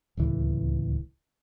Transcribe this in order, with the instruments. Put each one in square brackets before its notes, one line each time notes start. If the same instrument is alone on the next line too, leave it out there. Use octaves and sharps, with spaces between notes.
[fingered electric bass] D1 C#2 E3